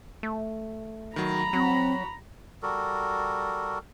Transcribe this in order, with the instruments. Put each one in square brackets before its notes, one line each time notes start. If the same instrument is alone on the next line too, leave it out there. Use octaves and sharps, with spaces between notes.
[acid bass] A3
[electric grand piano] D#3 F#3 [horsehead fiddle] A#5 B5
[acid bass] F#3 [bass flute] C4 [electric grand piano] F#4
[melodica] G3 F#4 A4 A#4